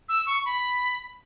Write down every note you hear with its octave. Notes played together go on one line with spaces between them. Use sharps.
E6
C#6
B5